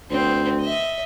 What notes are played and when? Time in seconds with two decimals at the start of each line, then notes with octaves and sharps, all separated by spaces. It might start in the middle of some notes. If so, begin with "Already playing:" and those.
0.10 D2 B3 C4
0.60 D#5 E5